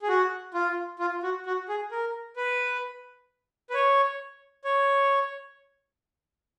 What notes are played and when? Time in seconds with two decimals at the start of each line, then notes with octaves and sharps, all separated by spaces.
0.02 G#4
0.08 F#4
0.54 F4
0.99 F4
1.23 F#4
1.46 F#4
1.69 G#4
1.91 A#4
2.36 B4
3.70 B4
3.74 C#5
4.65 C#5